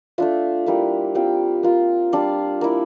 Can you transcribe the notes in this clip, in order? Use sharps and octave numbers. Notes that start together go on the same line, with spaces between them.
A3 D4 F4 E5
G3 A#3 E4
G3 C4 F4 G5
A#3 F4
G3 D4 F4 F5
A#3 E4